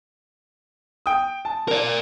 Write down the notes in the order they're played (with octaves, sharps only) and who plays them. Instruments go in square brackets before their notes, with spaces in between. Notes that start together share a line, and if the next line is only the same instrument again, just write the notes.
[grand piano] G5 D#6
A5
[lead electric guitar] A#4 D5